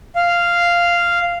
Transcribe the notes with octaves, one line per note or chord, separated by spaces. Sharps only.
F5